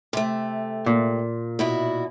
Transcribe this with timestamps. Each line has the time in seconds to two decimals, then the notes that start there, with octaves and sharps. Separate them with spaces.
0.13 C3 A3
0.86 A#2
1.59 B2 E4 F#4